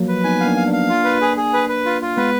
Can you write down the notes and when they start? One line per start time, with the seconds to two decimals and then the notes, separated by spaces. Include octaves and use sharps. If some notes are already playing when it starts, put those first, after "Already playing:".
Already playing: F3 F#3 A#3
0.08 B4
0.24 B3 D#4 G#5
0.40 B3 F5
0.46 A#3 D4
0.56 F5
0.68 A#3 D4
0.73 F5
0.89 F4
1.04 B4
1.21 G#4
1.37 G#4
1.53 B4
1.69 B4
1.86 F4
2.02 F4
2.17 G#3 B3 B4